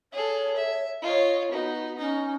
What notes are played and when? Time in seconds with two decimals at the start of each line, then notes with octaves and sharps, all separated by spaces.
0.13 G#4 A4 C#5
0.56 E5
1.02 F4 C#5 D#5
1.52 B3 D#4 F#4
1.98 C#4 D#4